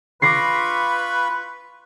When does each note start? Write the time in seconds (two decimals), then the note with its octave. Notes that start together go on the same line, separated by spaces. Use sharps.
0.22 F4 B4 B5 C#6 D6 A#6 C7